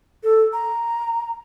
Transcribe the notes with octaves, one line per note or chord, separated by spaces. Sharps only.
A4
A#5